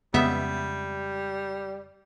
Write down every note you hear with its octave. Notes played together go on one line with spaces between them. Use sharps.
F2 C#3 G3 G#3 B3 E5